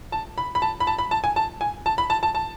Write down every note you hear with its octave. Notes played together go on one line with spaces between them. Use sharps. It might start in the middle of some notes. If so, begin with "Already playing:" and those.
A5
B5
B5
A5
B5
A5
B5
A5
G#5
A5
G#5
A5
B5
A5
A5
A5